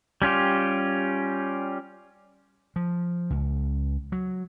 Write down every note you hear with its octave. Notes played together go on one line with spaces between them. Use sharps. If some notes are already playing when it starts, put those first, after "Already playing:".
G3 C#4 F4 G4
F3
C#2
F#3